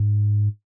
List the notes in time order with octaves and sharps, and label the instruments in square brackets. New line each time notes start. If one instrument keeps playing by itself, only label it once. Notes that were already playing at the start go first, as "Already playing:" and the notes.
Already playing: [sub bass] G#2